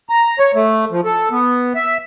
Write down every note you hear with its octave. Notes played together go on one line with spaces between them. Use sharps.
A#5
C#5
A3
F3
A4
B3
E5